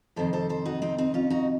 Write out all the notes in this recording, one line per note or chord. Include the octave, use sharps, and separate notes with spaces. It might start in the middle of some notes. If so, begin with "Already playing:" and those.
F2 C3 D#3 A4 C5
A4 C5
A4 C5
D#4 F#4
C4 D#4
C4 D#4
C#4 F4
D#4 F#4